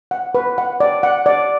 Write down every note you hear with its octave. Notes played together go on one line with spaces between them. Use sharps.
F#5
B4
F#5
D5
F#5
D5